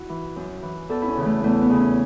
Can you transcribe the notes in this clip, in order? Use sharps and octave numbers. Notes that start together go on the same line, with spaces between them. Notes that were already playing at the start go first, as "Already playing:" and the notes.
Already playing: E4 F#4
E3
F#2
E3
E2 A4
E4
C#4
C#3 E3
A3
E2 A3
B3
C#3 E3
C#4